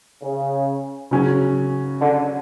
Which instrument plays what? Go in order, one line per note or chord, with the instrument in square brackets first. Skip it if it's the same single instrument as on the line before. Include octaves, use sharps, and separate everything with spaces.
[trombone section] C#3
[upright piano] C#3 F#3 C#4
[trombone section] D3